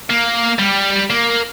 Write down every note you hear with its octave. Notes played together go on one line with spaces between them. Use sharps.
A#3
G3
A#3